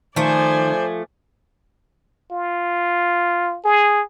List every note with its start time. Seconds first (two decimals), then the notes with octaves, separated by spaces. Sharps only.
0.16 D#3 F3 A3 C5 D5 G#5
2.32 F4
3.65 G#4